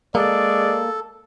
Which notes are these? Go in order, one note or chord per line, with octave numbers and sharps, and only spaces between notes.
G#3 A#3 A4 D5